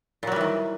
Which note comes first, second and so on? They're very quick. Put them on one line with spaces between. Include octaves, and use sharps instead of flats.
A#2 F#3 G3 E3 D#3